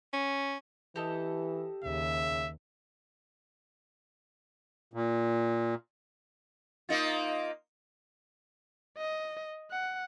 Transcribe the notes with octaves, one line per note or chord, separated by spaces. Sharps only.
C#4
E3 G4 A4 D#5
D#2 C#3 E5
A#2
A#3 D#4 F4
D#5
F#5